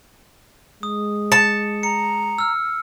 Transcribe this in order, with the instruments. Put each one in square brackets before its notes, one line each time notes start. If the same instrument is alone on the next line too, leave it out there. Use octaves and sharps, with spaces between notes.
[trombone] G#3 [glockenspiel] D#6
[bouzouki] A5 [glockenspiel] C#7
[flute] A#5 [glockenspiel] C#7
[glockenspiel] E6 F6